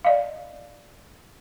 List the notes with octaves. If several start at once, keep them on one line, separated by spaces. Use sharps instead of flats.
D5 D#5 F5